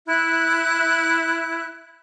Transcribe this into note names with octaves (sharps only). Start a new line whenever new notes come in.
E4 F#6